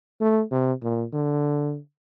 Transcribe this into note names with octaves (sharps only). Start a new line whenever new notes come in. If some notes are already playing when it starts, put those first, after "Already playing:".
A3
C3
A#2
D3